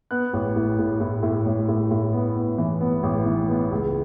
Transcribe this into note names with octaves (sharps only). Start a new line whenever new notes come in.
B3 F#6
A1
A2
A2
A2
A2
A1
A2
A2
B3
B3
E3
B3
A1
E3
B3
C#2